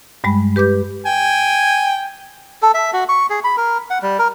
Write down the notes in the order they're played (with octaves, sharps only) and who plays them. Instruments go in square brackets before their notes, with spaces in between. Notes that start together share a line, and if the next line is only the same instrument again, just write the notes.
[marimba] G2 G3 G#3 B5
G4 B4 D6 G6
[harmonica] G5 G#5
[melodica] A4
E5
F#4
C#6
G#4
B5
A#4
F#5
G3
A#4